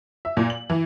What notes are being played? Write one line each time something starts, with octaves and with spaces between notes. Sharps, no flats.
E5
A#2
F#7
E3